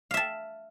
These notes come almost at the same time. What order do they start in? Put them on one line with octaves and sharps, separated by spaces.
F5 E5 A5